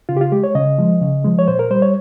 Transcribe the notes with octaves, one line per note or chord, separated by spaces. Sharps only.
C#3 F4
G4
F4
G#3 G4
C#5
C#3 D#5
F3 G#3
C#3
F3 G#3
C#5
A#2 C5
A#4
G3 C5
C#5